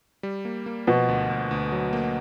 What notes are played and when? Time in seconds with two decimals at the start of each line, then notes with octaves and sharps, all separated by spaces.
0.23 G3
0.45 A#3
0.66 A#3
0.87 B2 F3
1.08 D2
1.30 D2
1.51 D2
1.72 F#3
1.93 A#3